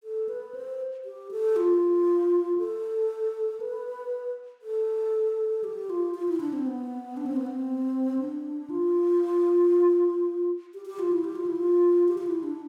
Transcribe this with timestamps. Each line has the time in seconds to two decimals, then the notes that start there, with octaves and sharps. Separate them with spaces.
0.04 A4
0.29 B4
0.54 C5
1.05 G4
1.31 A4
1.56 F4
2.58 A4
3.60 B4
4.62 A4
5.64 G4
5.90 F4
6.15 F4
6.28 E4
6.40 D4
6.53 C4
6.67 B3
7.17 D4
7.26 C4
7.36 B3
7.46 C4
8.19 D4
8.70 F4
10.74 G4
10.86 G4
10.99 F4
11.12 E4
11.24 G4
11.36 F4
11.46 E4
11.56 F4
12.08 G4
12.18 F4
12.27 E4
12.43 D4